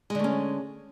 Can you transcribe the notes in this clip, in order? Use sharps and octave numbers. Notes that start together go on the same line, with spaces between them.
D3 G#3 A3 C#4